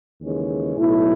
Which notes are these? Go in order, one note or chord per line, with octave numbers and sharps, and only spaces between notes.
D#2 C#3 E3 G#3 C#4
B1 A2 F#3 A3 E4